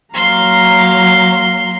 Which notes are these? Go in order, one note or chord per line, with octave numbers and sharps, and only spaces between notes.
F#3 A#3 F5 A#5 C6